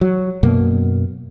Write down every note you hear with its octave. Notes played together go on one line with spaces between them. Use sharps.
F#3
F#2 B2 A#3